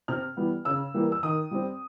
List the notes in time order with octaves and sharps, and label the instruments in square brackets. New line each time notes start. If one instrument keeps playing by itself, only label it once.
[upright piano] C3 F6
E3 G3 B3
C#3 E6
E3 G3 A#3
E6
D#3 D#6
G3 C4